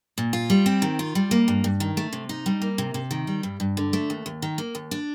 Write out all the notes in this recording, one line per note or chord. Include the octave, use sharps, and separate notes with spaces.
A#2
F4
G3
C4
D#3
F4
G3
A#3
G2
G2
D#3
A3
C3
D#4
G3
A#3
C3
C3
D#3
G3
G2
G2
D3
A3
D#2
D#2
D#3
A#3
D#2
D4